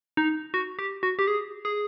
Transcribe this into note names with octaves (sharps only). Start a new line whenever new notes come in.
D#4
F#4
G4
F#4
G4
G#4
G#4